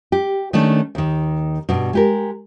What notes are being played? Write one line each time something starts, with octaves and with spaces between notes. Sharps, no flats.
G4
D#3 A3 C#4 D4
D#2 D#3
G2 B2
G#3 G4 A#4